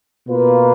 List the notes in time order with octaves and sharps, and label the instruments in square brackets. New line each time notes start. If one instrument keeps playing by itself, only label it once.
[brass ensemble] B2 A#3 F4 B4